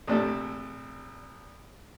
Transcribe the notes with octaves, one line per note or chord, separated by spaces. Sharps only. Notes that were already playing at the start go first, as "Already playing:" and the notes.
A#1 C3 A3 D4 A4